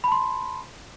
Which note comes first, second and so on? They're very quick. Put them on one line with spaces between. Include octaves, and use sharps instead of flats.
B5 A5 C6